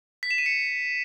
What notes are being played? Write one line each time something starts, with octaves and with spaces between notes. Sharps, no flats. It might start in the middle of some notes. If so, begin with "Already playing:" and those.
B6
E7
D#7
C#7